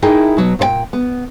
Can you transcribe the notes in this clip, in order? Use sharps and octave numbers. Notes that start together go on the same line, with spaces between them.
D#4 E4 G#4 A#4 D#5 G5
B2 F#3
A#2 C5 G5
B3